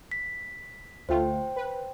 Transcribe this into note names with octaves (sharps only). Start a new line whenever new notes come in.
B6
D2 A3 F4 C5 G5
B4